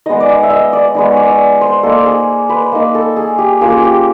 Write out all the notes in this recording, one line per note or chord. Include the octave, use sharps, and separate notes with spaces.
G#3 B3 D#4 D#5
D5
D#5
E5
D#5
D5
G#3 B3 D#4
C#5
D5
C5
A#3 D#4 A4
G#4
B4
A#3 D#4
A4
G#4
G4
A#3 C#4 F4 G#4
G#4
G4